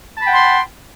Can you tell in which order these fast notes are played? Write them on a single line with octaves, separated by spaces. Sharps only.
A5 B5 G5 F#5 C6